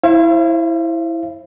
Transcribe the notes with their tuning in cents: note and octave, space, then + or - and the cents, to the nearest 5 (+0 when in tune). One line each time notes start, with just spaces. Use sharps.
E4 +0 C5 +35 F5 -40